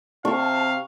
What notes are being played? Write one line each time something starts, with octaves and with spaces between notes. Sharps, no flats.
C3 F5 A5 C#6